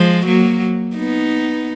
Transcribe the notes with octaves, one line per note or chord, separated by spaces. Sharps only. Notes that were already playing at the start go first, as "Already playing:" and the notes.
Already playing: F3 G#3
F#3 A#3
B3 D#4